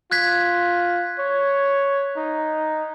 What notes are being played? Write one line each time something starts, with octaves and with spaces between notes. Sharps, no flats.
F4 F#6 G#6 B6
C#5
D#4